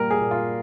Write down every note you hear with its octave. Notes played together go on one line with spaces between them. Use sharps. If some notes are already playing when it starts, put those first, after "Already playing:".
Already playing: A#2 G3 A#3 A#4
G#4
A#2
F4